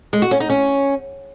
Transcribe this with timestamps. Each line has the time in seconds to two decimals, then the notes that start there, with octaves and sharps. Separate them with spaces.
0.13 G#3
0.22 F#4
0.31 C#4
0.40 D#4
0.50 C#4